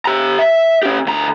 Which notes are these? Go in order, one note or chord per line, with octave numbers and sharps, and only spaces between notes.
G4 A#5
E5
C#4 G4
D2 A#5